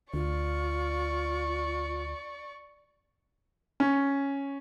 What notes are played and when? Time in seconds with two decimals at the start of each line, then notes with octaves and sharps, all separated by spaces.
0.14 D2 F4 D5 C#6
3.80 C#4